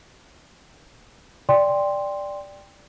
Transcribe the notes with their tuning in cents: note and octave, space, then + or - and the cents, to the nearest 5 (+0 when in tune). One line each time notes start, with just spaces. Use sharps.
D5 +0 G5 +15 C6 +0